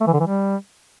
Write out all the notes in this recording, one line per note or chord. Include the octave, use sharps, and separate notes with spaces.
A3
E3
D3
E3
G3